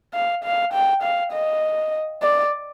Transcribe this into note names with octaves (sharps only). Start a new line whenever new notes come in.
F5
F5
G5
F5
D#5
D5